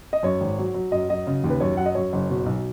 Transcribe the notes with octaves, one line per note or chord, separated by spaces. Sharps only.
D#5
F#2 C#5
G#1
F#3
F#3
F#2 D#5
F#3 D#5
C#3
D#2
B4
F#2 C#5
F#3 F#5
D#5
F#2 C#5
F#1
B2
B1